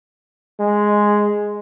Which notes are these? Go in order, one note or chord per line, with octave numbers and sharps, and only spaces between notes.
G#3